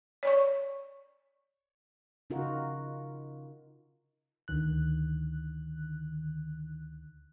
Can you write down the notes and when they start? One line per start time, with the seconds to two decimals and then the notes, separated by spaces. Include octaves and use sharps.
0.23 C#5 D5 C#6
2.30 C#3 D#4 F4 F#4 A#4
4.48 D2 D3 D#3 F#6